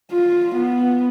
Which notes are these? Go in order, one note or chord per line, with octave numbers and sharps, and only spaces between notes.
F4
B3